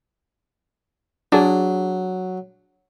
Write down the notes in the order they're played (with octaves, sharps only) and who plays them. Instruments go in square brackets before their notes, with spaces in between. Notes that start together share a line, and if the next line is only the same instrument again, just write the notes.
[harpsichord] F#3 [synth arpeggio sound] D4 G#4